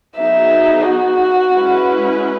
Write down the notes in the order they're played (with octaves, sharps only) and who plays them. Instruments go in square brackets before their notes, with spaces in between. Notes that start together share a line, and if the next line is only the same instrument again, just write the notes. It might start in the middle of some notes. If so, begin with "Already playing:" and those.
[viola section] F#3 B3 D#4 G#4 [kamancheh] E5
[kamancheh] F#4
[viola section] G#3 C#4 E4 B4